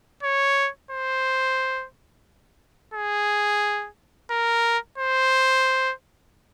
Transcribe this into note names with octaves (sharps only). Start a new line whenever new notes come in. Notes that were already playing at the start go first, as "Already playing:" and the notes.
C#5
C5
G#4
A#4
C5